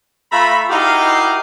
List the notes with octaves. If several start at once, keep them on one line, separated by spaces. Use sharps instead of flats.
A3 F4 E5 A#5 B5
D#4 E4 F#4 G4 A#4 F5